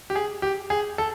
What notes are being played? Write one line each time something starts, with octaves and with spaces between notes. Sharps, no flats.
G4
G#4
G4
G#4
A4